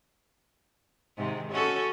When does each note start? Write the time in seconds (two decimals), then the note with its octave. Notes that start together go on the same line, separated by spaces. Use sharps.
1.17 G#2 C3 D#3
1.52 C#4 F#4 A4